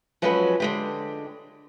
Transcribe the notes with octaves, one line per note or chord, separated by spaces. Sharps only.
F3 F#3 G#3 C#4 F#4 B4
D3 G#3 G4